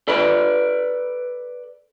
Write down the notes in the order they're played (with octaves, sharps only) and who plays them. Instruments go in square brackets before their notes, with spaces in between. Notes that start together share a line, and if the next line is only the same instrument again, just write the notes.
[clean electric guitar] A4 B4 D5 B5